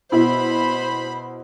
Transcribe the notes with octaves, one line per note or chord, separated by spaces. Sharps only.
B2 E4 C5 B5